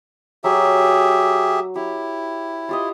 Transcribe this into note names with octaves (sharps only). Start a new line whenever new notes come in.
F#3 G4 G#4 E5
E4 G4
F4 G4 D#5